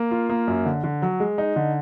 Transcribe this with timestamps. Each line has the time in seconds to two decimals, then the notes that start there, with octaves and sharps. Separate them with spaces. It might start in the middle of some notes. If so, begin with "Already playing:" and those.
Already playing: A#3
0.11 F4
0.29 A#3
0.48 F#2
0.65 D3
0.84 D3
1.02 F#3
1.20 G#3
1.38 D#4
1.56 D3